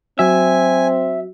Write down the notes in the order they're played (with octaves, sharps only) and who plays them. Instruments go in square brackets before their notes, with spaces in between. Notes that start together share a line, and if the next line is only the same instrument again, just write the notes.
[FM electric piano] F#3 F#4 [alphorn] C4 [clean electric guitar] E5 [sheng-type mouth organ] G#5